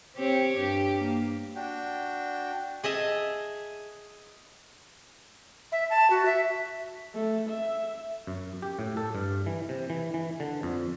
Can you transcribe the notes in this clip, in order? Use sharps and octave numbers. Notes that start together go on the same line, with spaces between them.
C4 G4 C#5
G2 G4
A#3
D4 F#4 G5
G#4 D#5 E5 A5
E5
A5
F#4
E5
A3
E5
F#2
G4
A2
A4
G2
E3
C3
E3
E3
D3
F2